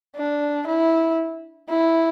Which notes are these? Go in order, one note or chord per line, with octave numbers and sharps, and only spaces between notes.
D4
E4
E4